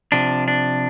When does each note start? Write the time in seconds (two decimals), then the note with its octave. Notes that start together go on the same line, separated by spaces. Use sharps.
0.12 C3 F3 D4
0.48 D4